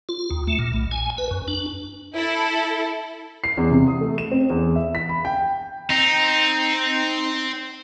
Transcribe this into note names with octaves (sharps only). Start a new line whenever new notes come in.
F4
D#2
A3
A#2
B1
G#5
B4
F#2
D4
E4 A4
C7
E2
C3
D#6
A3
E7
C4
E2
E5
B6
B5
G5
C4 D#4